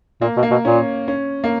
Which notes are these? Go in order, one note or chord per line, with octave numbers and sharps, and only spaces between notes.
A#2 A#3
B2
A#3
B2
A#2 C#4
C#4
A#3